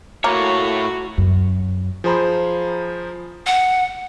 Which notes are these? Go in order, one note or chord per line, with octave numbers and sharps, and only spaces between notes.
A2 A#3 F#4 C#5
F#2
F3 G#4 C5 A#5 B5
F#5